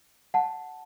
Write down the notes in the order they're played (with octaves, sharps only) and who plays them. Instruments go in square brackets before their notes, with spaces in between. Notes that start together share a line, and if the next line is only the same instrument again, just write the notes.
[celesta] F#5 A5